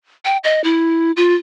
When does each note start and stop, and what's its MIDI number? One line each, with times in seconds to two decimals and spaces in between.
0.25 0.37 79
0.44 0.63 75
0.64 1.12 64
1.17 1.35 65